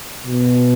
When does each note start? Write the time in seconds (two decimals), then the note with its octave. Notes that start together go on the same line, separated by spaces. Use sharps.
0.26 B2